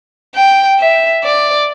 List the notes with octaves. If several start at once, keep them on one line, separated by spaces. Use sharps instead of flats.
G5
E5
D5